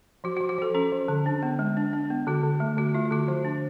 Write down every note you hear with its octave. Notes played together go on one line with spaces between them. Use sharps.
F3 F#4
F#4
F3
F#4
F3 A4
C#4 A4
F3
D3
D4
B3
G#3
D4
D4
B3
D3 F#4
D3
A3
D3 F#4
A3 F4
F4
D3 F#4
F3 F#4
D4